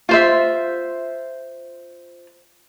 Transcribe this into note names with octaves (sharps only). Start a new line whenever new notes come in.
F4 C5 E5